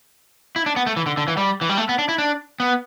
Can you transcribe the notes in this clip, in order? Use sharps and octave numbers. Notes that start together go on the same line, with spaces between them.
E4
D4
B3
A3
E3
D3
D3
E3
G3
E3
G3
A3
B3
D4
E4
D4
B3